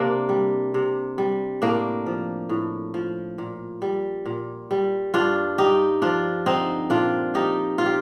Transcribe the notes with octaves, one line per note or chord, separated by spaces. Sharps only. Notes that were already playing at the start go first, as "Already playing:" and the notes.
Already playing: C3 A#3 D4
G3
C3
G3
A2 A#3 D4
F3
A2
F3
A#2
G3
A#2
G3
G2 D4 F4
G2 D#4 G4
F3 D4 F4
D3 C4 D#4
A#2 D4 F4
F3 D#4 G4
A#2 F4
G4